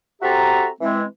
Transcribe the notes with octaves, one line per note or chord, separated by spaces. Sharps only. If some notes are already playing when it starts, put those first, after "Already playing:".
C4 F#4 G4 A4 E5 A#5
E3 G#3 C4